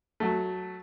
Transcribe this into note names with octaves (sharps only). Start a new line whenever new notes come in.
F#3 A3